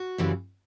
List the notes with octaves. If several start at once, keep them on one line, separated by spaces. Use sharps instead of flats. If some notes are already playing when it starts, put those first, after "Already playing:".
Already playing: F#4
F#2 C#3 E3 G3